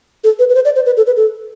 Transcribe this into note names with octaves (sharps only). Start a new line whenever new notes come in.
A4
B4
B4
C5
D5
C5
B4
A4
B4
A4